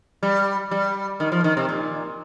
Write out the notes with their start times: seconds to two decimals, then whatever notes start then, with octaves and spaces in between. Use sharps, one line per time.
0.23 G3
0.71 G3
1.20 D#3
1.32 F3
1.44 D#3
1.57 C3
1.69 A#2